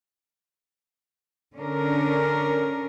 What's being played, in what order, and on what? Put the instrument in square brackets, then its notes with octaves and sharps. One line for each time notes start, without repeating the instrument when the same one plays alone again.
[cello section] D3 C#4 D4 A#4